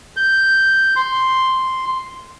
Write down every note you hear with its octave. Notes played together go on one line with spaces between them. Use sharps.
G6
C6